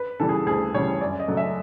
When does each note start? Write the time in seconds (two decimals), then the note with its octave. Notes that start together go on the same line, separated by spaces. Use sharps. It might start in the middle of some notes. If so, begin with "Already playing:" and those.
Already playing: B4
0.20 C#3 E3 G3 A4
0.29 G#4
0.46 D2 G#4
0.74 C#3 E3 G3 C#5
1.01 F#2 D5
1.20 D#5
1.28 C#3 F#3 A3
1.37 E5